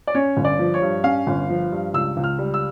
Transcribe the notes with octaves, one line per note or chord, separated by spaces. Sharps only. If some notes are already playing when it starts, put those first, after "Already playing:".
D5
C#4 C#5
G1
D5
F3
C#5
G2
C#4 F5
G1
F3
G2
C#2 E6
C#2
F6
G3
E6